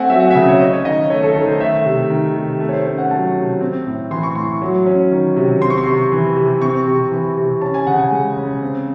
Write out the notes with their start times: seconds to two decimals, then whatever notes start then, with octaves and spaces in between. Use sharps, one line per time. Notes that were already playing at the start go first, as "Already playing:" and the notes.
Already playing: A3 C4 F#5 G#5
0.10 F#3 E5
0.20 F#5
0.31 E5
0.35 C#3
0.48 C#5
0.60 C#4 D#5
0.73 C#5
0.85 D#3 D#5
1.10 A3 C#5
1.23 A4
1.35 D#3 A4
1.48 C5
1.60 A3 E5
1.85 C3
2.10 D#3
2.36 C3
2.60 A3
2.69 C#5
2.73 C5
2.86 C#4
2.98 F#5
3.11 F#3 A5
3.36 C3
3.61 C4
3.86 A2
4.11 E3 C6
4.23 C#6
4.35 A2 C6
4.62 F#3
4.86 C#4
5.11 D#3
5.37 C3
5.62 C4 C6
5.70 C#6
5.78 C6
5.86 C3
6.12 E3
6.36 C3
6.62 C4 C#6
6.87 C3
7.12 E3
7.37 C3
7.61 C#4 A5
7.74 G#5
7.87 C#3 F#5
7.99 G#5
8.11 G#3
8.37 C#3
8.62 C4